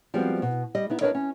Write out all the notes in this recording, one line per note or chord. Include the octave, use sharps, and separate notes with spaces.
F3 G3 G#3 B3 C4 F#4
B2
G3 D#5
B3 D#4 E4
D4 F4 A#4 B4 C#5 D#5
C#4